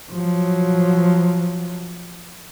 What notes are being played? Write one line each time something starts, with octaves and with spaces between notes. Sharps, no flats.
F3 F#3